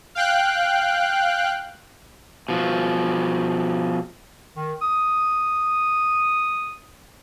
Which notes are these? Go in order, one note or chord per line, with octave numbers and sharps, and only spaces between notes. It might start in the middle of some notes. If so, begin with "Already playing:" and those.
F5 G5 F#6
B2 F3
D#3
D#6